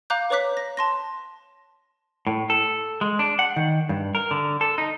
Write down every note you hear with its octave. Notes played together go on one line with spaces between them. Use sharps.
F5 A#5 D6 F#6 G6
B4 C#5 A#5 D6 F#6 B6
A#6
A5 C6 A#6
A2
A4
G#3
D4
F#5
D#3
G2
A#4
D3
A4
D#4